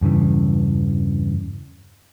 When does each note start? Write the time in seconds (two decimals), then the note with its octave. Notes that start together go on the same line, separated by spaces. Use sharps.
0.01 E2 G2 C#3 E3